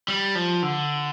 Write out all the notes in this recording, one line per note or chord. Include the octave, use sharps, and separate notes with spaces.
G3
F3
D3